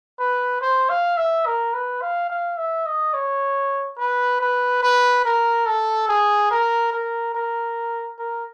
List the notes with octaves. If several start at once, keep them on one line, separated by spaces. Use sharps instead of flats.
B4
C5
F5
E5
A#4
B4
F5
F5
E5
D#5
C#5
B4
B4
B4
A#4
A4
G#4
A#4
A#4
A#4
A#4